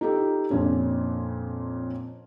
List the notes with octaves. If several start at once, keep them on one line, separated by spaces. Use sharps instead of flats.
D#4 F4 G4 A4
F2 A#2 C#4 D4